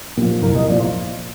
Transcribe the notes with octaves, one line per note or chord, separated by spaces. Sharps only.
A#2 F3
C2 A#4
D#5
A#2 F3 D5
F4